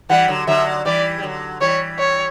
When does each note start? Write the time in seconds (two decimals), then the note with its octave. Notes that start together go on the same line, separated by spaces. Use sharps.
0.09 E3 G3 F#5
0.28 D3 F#3
0.47 D3 F#3 E5
0.85 E3 G3 D5
1.18 G3
1.23 D3 F#3
1.60 E3 G3 C#5
1.99 C#5